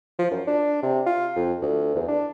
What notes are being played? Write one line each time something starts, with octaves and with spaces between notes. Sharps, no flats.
F3
F#2
D4
C3
F4
F2
D2
E2
D4